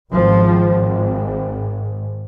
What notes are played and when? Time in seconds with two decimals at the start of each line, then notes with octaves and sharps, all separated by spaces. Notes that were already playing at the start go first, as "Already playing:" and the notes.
0.11 G#1 G#2 F3